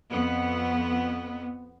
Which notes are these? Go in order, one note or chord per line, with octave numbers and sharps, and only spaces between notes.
F2 B3